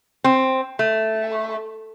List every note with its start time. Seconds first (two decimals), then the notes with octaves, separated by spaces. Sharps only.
0.24 C4
0.79 A3